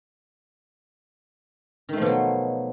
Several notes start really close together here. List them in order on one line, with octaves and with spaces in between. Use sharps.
D#3 A3 F3 B2 F#3